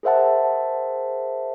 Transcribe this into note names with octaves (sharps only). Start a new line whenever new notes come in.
G#4 A#4 C5 E5 F#5 A5